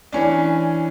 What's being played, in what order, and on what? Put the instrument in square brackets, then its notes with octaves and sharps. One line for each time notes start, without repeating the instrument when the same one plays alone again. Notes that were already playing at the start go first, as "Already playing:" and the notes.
[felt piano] E3 C#4 D4